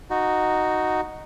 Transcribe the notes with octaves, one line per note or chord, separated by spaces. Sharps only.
D#4 F#4